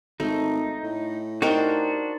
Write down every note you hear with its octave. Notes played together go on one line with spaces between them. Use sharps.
G#1 A3 D#4
A2
D4 D#4 F#4 G4 A#4 C5 D#5